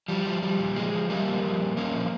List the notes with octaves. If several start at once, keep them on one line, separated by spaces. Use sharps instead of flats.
F3 G3
F3
F3 G3
A#2
F3 G#3
F3
A#2 G3 A#3
F3
F3
A#2
A#2 A#3 C#4
F3